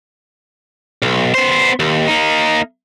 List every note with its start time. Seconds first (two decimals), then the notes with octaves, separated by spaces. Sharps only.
1.02 B1
1.34 B3 C5
1.80 D#2
2.08 A#3 D#4